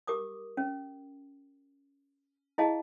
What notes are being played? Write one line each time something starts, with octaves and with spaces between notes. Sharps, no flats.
G4 A#4 D6 D#6
C#4
E4 G#4 D#5 F5 A5